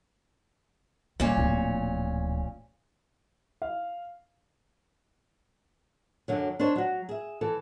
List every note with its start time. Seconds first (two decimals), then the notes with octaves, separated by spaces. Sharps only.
1.20 A#2 D#3 G3 C#4
1.37 D1 F3
3.62 F5
6.28 F#2 D3 F#3
6.59 D4 D#4 C5 C#5
6.76 F#3 F#4
7.09 G#4 E5
7.41 E3 A4